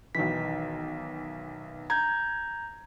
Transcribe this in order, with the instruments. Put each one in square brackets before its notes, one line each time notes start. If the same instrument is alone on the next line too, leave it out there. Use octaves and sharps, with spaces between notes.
[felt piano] B1 D#3 E3 [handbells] B6
[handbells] A#5 G6 [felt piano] G#6